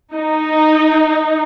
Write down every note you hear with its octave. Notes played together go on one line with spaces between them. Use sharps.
D#4